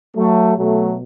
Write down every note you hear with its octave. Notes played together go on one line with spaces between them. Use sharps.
F#3 A3
B2 F#3 A3